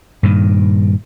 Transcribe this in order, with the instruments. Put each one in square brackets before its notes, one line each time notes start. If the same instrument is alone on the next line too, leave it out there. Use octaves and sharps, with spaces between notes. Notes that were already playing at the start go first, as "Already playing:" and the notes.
[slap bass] G2 A#2 D#3